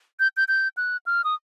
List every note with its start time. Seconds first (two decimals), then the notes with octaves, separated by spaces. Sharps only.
0.20 G6
0.37 G6
0.48 G6
0.77 F#6
1.06 F6
1.24 D#6